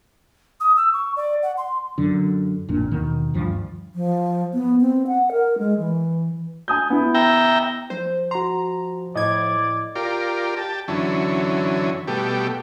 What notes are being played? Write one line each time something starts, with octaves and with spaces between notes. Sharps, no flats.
D#6
E6
C#6
D5
F#5
C6
F#2 D3
A1 F2 A#2 D4
D#2 B2 D#3
D2 G2 F3
F3
B3
C4
F#5
A#4
G#3
E3
G#5 D#6 G6
B3 E4
E5 G5 A#5
F3 C5
F#4 A#5 C6
A2 D5 D#5 G#6
F4 G4 A#4 D5
G4 A5
F#2 D3 E3 C#4
B2 G3 A3 G4